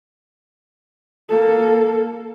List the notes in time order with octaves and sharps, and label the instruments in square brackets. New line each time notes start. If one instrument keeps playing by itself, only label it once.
[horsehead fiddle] A#3 A4